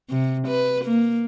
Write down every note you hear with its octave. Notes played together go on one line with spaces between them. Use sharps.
C3
B4
A#3